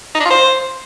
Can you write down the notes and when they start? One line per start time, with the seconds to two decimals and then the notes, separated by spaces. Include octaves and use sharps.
0.15 D#4
0.20 D4
0.25 F4
0.30 C5